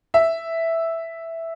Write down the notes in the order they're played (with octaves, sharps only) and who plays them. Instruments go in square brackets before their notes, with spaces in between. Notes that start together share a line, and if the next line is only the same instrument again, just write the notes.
[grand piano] E5